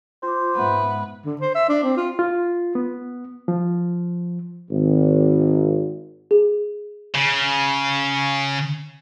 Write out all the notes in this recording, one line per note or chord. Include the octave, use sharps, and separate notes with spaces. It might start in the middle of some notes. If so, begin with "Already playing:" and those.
F4 C5 D6
G#2 B3 B4 E5 F#5
D3
C5
E5
D4
C4
F4
F4
B3
F3
G#1
G#4
C#3